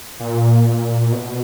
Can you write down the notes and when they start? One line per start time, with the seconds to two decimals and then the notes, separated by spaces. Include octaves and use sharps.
0.20 A#2
1.12 B2